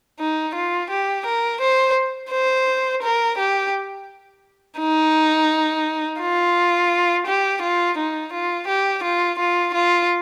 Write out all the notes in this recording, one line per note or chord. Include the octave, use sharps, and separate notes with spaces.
D#4
F4
G4
A#4
C5
C5
A#4
G4
D#4
F4
G4
F4
D#4
F4
G4
F4
F4
F4